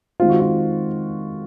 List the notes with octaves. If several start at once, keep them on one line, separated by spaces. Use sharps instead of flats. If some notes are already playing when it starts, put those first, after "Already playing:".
D#3 G#3 C4 F4
F#4
F4